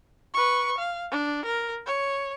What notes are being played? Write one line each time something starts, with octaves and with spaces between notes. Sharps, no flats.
B4 C#6
F5
D4
A#4
C#5